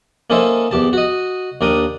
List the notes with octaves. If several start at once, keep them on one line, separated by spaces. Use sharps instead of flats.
A#3 C#4 D#4 A4 C5 E5
E2 G4 A5
F#4 D#5
D#2 D4 A#4 G5 D#6